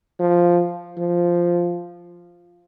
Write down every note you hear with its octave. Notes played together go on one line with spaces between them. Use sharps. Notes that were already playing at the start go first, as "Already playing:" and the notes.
F3
F3